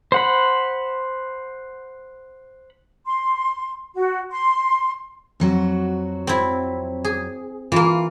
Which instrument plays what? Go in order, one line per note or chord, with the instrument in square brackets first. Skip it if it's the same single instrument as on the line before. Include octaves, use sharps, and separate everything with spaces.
[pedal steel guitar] C5 F#5 B5
[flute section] C6
F#4
C6
[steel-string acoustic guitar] F2 F#3 F#4
[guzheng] C4 E4
G#4
[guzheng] E3 A#3 [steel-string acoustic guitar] F4